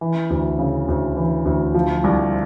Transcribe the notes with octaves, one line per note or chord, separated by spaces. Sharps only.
E3
D2
C#3
D2
E3
D2
F3
C2